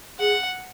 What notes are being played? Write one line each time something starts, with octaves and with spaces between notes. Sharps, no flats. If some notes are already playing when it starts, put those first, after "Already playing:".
G#4 F#5